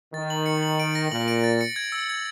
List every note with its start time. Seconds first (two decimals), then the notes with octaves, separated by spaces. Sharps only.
0.14 D#3 A6
0.30 F#7
0.46 C#7
0.63 F#7
0.80 D7
0.95 A#6
1.12 A#2 F#7
1.28 D7
1.44 A6
1.61 C#7
1.76 G#6
1.92 E6
2.09 G#6